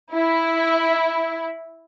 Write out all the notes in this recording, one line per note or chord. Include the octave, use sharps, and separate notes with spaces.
E4